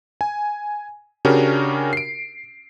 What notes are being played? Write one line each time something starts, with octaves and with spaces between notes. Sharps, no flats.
G#5
C#3 C#4 D4 F#4 G4 A#4
C7 D7